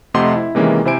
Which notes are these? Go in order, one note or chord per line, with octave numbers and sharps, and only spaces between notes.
F2 C3 A3 D#5 F#5 C6
E4
C3 D#3 E3 G#3 A#3 C#4
C3 E4 C5 G#5 D7